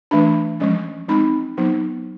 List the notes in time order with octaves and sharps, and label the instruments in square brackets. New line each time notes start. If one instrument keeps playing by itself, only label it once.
[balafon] E3 A3 D4 B5
F3 G#3 C#4
G#3 C4 D#4 B5
F#3 B3 D#4